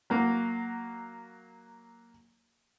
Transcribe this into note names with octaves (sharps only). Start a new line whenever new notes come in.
F#3 A#3